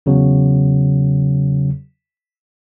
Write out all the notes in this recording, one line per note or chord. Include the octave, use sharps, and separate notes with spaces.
E2 C#3 F#3